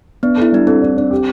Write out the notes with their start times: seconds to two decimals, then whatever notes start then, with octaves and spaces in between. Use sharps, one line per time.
0.23 B3 D4
0.37 E4 A4
0.52 G3 D4
0.67 C4 A4
0.82 D4
0.97 D4
1.11 G4